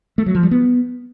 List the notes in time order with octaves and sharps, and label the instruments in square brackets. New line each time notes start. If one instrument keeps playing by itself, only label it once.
[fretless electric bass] A3
F#3
F3
G3
B3